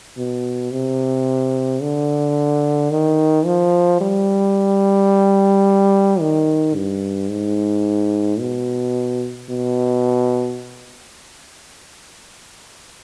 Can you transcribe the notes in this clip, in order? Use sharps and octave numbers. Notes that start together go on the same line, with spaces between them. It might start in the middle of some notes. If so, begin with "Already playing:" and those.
B2
C3
D3
D#3
F3
G3
D#3
G2
G#2
B2
B2